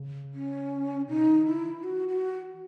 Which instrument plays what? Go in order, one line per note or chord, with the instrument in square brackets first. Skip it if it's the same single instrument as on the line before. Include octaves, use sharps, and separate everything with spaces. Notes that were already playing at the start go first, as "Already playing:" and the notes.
Already playing: [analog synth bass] C#3
[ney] C#4
[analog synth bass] B2 [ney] D#4
[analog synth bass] D#3
[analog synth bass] C#3 [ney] E4
[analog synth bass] E3
[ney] F#4
F#4